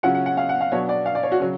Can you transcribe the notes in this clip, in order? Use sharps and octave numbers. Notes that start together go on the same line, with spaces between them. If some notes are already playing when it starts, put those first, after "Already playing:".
C#3 F#3 C#4 F4 F#5
F#5
F#5
F5
F#5
F5
B2 F#3 B3 D4 C#5
D5
F5
D5
C#5
F#4
C#3 F#3